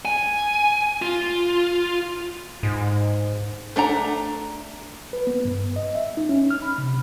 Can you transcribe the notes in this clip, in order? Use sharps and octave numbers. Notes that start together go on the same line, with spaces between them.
G#5
F4
G#2
A3 D4 F#5 A#5
B4
B3
G2
D#5
E5
D#4
C#4
F6
B5
C3